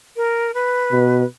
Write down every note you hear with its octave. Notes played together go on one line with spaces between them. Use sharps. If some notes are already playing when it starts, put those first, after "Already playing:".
A#4
B4
B2